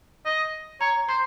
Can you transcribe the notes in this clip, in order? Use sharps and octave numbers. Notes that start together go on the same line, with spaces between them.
D#5
C#5 A#5
C5 C6